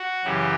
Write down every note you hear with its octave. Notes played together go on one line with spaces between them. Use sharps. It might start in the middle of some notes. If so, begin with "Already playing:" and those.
Already playing: F#4
F#2 C#3 E3 G4